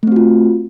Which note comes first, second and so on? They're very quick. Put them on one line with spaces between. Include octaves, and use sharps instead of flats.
A3 C4 F#4 F4